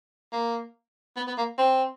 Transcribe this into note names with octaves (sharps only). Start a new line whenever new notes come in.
A#3
B3
B3
A#3
C4